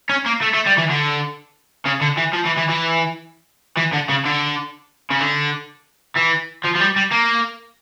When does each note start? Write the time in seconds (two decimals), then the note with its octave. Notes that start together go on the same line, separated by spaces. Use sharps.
0.09 C#4
0.26 A#3
0.42 A3
0.53 A3
0.66 G3
0.77 E3
0.90 D3
1.86 C#3
2.01 D3
2.17 E3
2.33 F3
2.45 E3
2.57 E3
2.69 E3
3.77 E3
3.93 D3
4.09 C#3
4.25 D3
5.10 C#3
5.20 D3
6.16 E3
6.64 F3
6.75 F3
6.80 G3
6.96 G3
7.12 A#3